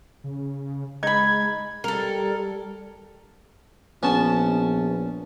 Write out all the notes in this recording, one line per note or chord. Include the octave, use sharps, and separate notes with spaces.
C#3
G#3 D#4 B5 G#6
G3 A4 A#4
A#1 B3 C#4 A5